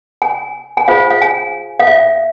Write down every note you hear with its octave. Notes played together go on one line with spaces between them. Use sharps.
G#5
G#5
F4 G#4 C5 F5
F5
G#5
F5
E5